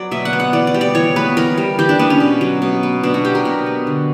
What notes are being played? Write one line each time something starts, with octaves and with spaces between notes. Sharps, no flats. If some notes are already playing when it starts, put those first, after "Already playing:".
Already playing: F#3 B3 D5
B2 E5
F#5
B3
F#5
E3 D5
D5
G3
D5
E3 C#5
B3 B4
E3 A#4
G3
E3 G4
D4
B3 D4
C#4
B2
F#3
B2
B3
B2 D4
F#4
F#3 G4
A#4
B2
B3
D3